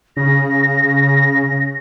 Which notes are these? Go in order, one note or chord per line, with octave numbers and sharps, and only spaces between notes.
C#3 A#6